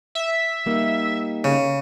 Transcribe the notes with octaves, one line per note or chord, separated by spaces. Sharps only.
E5
G3 A#3 D#4
C#3